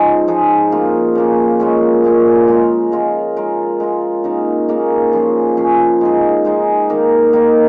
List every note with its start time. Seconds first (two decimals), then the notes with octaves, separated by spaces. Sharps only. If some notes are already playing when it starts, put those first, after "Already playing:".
Already playing: F3 G#3 C#4 D#4 G#4
0.28 F3 G#3 D#4 G#4
0.71 C#3 A#3 F4
1.15 C#3 A#3 F4
1.60 A#2 G#3 C#4
2.04 A#2 G#3 C#4
2.48 G#3 F4 A#4
2.92 G#3 F4 A#4
3.37 G#3 F4 A#4
3.80 G#3 F4 A#4
4.24 C#3 A#3 D#4 A#4
4.68 C#3 A#3 D#4 A#4
5.13 F3 C#4 G#4
5.57 F3 C#4 G#4
6.01 G#3 D#4 G#4
6.45 G#3 D#4 G#4
6.89 D#3 A#3 D#4 A#4
7.33 D#3 A#3 D#4 A#4